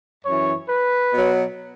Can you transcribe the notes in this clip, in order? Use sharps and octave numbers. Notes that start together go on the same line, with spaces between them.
F#2 E3 C#5
B4
B2 F#3